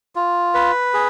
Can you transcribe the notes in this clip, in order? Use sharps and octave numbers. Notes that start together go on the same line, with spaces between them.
F4
B4
G#4